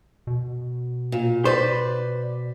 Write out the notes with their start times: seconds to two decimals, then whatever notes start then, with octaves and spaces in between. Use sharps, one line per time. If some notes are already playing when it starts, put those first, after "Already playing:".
0.27 B2
1.12 A#2
1.45 B4 C5 D5